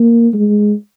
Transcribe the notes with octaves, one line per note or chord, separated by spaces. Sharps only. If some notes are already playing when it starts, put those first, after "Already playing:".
Already playing: A#3
G#3